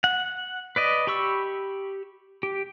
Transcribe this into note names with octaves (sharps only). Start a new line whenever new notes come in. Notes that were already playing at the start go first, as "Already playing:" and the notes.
F#5
B4 D5 D#5
G4 B5 C#6 E6
G4